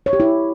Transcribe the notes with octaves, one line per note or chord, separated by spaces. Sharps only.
C#5
G4
E4